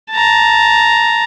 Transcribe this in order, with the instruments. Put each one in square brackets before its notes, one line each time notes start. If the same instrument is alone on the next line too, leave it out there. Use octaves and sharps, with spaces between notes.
[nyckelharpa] A5 A#5